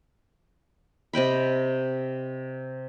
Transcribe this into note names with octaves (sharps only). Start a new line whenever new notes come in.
C3 D#5 G5 B5